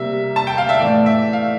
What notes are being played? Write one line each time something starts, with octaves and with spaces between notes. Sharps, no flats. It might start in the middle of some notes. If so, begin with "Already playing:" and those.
Already playing: C3 G3 A#3 E5
A5
G5
F5
E5
A2 E3 A3 D5
E5
F5